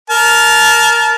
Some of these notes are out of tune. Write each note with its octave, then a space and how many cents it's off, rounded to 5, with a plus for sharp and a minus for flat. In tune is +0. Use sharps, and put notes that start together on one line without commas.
A#4 +0 A5 -25